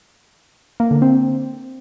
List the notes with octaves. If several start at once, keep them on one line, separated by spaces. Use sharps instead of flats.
A#3
D3
C4